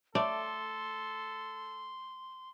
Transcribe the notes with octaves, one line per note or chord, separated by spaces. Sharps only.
A3 A4 D5 C6